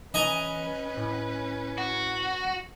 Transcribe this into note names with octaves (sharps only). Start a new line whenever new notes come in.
E3 C#4 B4 D#5 G#5 A#5
A2
F#4